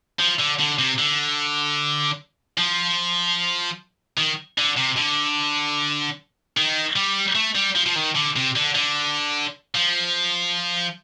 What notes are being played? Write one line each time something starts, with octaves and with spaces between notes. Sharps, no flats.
F3
D3
D3
C3
D3
F3
D#3
D3
C3
D3
D#3
G3
A3
G3
F3
F3
D#3
D3
C3
D3
D3
F3